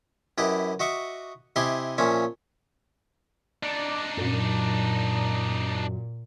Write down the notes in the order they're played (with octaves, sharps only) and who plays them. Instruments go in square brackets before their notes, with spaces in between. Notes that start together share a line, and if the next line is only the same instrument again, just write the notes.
[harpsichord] F#2 E4 G4 B4 D#5
F#4 D#5 E5 C#6 D6
C3 E4 G4 D#5 G#5 C6
A#2 F3 C#4 E5
[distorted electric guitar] D4 D#4 [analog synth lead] D5
[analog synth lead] F#2 [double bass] A#2